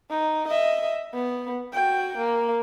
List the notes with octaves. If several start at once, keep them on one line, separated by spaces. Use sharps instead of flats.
D#4
D#5 E5
B3
F#4 G5
A#3